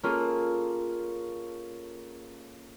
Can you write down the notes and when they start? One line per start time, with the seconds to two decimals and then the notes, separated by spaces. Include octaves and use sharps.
0.03 A#3 C#4 F4 G#4 A4